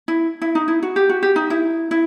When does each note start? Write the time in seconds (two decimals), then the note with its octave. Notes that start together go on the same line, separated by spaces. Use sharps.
0.08 E4
0.42 E4
0.55 D#4
0.68 E4
0.83 F#4
0.96 G4
1.09 F#4
1.23 G4
1.36 D#4
1.50 E4
1.91 E4